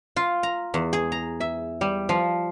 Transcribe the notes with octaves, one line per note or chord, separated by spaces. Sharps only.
F4
A#5
E2
G#4
A#5
E5
G3
F3